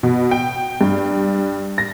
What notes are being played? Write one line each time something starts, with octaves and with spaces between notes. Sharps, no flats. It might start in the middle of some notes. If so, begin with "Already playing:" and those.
B2
G5
G2
A#6